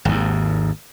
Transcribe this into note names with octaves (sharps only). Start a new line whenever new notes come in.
G#1 D#2